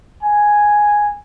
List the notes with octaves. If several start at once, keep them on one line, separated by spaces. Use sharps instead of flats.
G#5